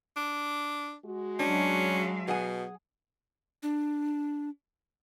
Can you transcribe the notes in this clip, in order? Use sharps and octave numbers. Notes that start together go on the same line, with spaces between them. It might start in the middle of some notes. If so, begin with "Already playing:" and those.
D4
G#3 F#4
F#3 C#4 D4 F5
B2 G#4 F#5 G#5
D4